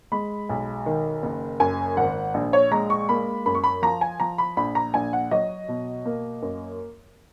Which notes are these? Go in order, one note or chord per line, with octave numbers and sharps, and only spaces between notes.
G#3 B5
B1
D#3
F#1
F#2 G#5
G#1 F#5
A#1
C#5
G#3 A#5
C#6
A#3 B5
F#2 B5
C#6
B5
F3 A#5
G#5
F3 A#5
B5
A#1 B5
A#5
A#1 G#5
F#5
F#3 D#5
B2
A#3
F#2